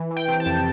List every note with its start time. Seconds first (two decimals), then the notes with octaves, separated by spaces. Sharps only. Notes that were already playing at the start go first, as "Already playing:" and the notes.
Already playing: E3
0.11 E3
0.16 G5
0.28 C3
0.40 A5
0.46 F2